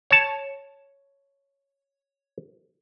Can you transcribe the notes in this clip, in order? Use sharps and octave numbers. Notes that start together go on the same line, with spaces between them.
C#5 A5